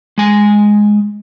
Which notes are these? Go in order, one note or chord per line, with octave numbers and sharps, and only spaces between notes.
G#3 G#5